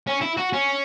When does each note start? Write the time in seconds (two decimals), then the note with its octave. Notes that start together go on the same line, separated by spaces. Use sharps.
0.07 C#4
0.22 E4
0.37 F#4
0.53 C#4